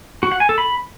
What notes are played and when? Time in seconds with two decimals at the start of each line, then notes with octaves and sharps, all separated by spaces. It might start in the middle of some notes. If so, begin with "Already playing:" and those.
0.23 F#4
0.32 F#5
0.40 G#5
0.49 A4
0.58 B5